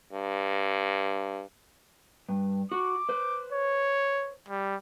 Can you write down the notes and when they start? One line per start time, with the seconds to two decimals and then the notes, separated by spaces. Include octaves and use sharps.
0.13 G2
2.29 G2
2.72 F#4 D6
3.09 B4 C5
3.52 C#5
4.49 G3